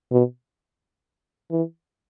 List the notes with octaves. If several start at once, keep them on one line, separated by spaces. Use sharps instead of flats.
B2
E3